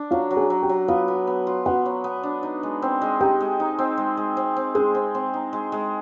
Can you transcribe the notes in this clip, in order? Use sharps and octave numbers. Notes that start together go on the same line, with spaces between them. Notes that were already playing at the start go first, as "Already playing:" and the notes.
Already playing: D4
F#3 F4 F5
F#3
G#4 G#5
F#3
G4 G5
F#3
B3 F4 F5
B3
B3
F4
B3 F#4 F#5
F#3
B3
D4
D#4
G#3
C4
G#3
D#4 G4 G5
G#3
D#4
C4
G#3
G#3
C4
C4
G#3 G#4 G#5
C4
C4
D#4
G#3
G#3